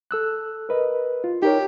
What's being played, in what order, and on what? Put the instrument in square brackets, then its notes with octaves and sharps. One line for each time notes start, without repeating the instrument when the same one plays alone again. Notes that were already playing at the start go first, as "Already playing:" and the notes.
[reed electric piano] A4 E6 F#6
A#4 B4 D#5
F4
[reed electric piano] D#4 A#4 C#5 [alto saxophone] G4